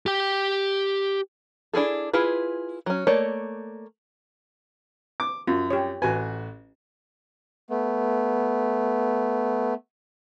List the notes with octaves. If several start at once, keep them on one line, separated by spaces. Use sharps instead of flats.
G4 G5
D4 E4 G#4 A4
E4 F4 G#4 B4
F#3 C#4
A3 A#3 C#5 D5
D6
F#2 F4
G4 C#5
A1 F#4 B4 G#5
A3 B3